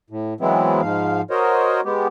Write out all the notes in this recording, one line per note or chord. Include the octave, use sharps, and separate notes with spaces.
A2
E3 F#3 G#3 B3 C4 E4
G#2 F3 F5
F#4 A#4 C5 C#5 D#5
G#3 B3 G4